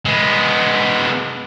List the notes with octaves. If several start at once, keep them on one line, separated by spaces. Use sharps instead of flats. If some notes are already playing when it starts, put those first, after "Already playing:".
G#3 B3